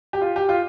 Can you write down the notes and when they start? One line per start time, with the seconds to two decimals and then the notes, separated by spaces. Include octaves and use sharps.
0.13 G4
0.21 F4
0.36 G4
0.49 F4